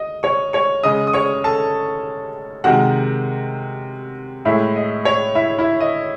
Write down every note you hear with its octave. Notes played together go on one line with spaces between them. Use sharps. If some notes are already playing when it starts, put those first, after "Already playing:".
Already playing: D#5
C#5 C#6
C#5 C#6
C#3 G#3 D#5 D#6
D#6
C#5 C#6
A4 A5
C3 D#3 G#3 F#4 F#5
A2 G#3 E4 E5
D#5
C#5
E4 E5
E4 E5
D#5